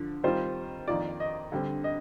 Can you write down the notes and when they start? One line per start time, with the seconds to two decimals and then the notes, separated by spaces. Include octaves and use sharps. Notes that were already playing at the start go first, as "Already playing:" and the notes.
Already playing: D3 F3
0.24 D#3 G3 C4 F4 C5
0.88 F2 D#3 A#3 F4 D5
1.20 D#5
1.52 D3 G3 C4
1.84 D#5